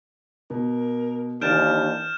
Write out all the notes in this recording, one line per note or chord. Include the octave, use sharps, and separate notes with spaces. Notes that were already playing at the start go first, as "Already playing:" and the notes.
B2 A#4
D#2 E3 D4 F6 G6 A6 D7 E7